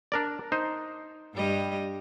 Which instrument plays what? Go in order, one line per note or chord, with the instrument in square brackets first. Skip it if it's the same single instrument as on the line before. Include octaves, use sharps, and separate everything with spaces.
[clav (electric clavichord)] D4 A#4 D5
D#4 C5
[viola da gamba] G2 G3 D#5